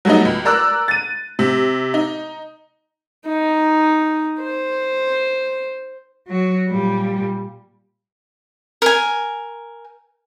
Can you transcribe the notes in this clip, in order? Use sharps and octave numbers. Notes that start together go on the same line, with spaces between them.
F#3 G3 A3 B3 D#4
C#2
A#4 D5 A#5 E6 F#6
A6 D#7
C3
D#4
D#4
C5
F#3 F#4
A#2 G3
A#4 G#5